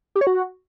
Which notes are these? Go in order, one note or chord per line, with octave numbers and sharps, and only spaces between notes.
G4
C#5
F#4